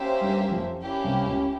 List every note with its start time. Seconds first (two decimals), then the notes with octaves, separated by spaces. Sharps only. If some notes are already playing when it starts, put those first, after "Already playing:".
Already playing: A#3 C#4 G4 C5 E5
0.21 G2 G3
0.51 F2 F3
0.82 A#3 C#4 E4 G4
1.04 C2 C3
1.26 C#2 C#3